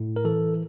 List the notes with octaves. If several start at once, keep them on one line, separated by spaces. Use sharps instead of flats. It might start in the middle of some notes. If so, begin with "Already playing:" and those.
Already playing: A2
A#4
E3 A4